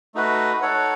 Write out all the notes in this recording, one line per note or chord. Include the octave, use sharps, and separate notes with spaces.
A3 D#4 F#4 B4
D#4 A4 C#5 F#5